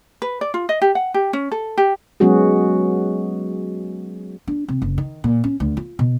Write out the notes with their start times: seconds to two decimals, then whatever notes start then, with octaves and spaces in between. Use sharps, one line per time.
0.22 B4
0.41 D5
0.54 F4
0.69 D#5
0.82 G4
0.95 F#5
1.14 G4
1.33 C#4
1.52 A4
1.78 G4
2.20 F#3 G#3 B3 C#4 F#4 G#4
4.47 D4
4.68 C3
4.82 F#1
4.98 D#3
5.24 A#2
5.44 C#4
5.60 D2
5.77 F4
5.99 B2